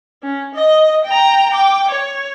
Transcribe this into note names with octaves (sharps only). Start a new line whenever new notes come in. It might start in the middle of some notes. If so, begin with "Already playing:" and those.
C#4
D#5
G5 A#5
G5 D6
C#5